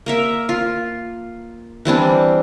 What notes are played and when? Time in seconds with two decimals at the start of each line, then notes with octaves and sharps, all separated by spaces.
0.06 A#3 A#4 E5
0.49 F4
1.85 E3 G3 C4 D4